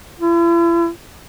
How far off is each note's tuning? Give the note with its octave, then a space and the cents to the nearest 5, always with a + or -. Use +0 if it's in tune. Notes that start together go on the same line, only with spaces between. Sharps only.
E4 +45